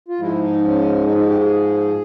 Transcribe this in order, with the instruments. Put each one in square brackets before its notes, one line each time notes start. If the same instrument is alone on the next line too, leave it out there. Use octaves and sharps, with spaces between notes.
[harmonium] F4
G#2 F3 G#3 E4
D#4
C#4
D#4
D#4
G4
G#4